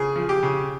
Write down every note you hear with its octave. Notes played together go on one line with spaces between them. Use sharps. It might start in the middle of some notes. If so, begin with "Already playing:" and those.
Already playing: C#3 G#4
F3
G4
C#3